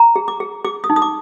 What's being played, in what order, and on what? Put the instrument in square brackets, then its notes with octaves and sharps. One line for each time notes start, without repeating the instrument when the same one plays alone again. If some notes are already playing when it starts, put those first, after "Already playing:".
Already playing: [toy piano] A#5
G#4
D6
G#4
G#4 D6
D#6
D#4
D#6
D6